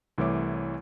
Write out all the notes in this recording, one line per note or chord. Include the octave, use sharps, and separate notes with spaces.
C2 E3 A3 E4 C#5 D6